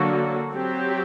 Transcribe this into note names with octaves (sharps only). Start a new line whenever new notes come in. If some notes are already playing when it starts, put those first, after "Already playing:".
Already playing: D3 F#3 A#3 F#4 A4
F#3 C4 G4